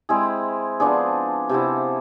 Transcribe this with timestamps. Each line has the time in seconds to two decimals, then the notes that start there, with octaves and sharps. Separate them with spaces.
0.09 G#3 C4 E4 G#4
0.80 F3 B3 D4 G#4
1.49 C3 F3 B3 E4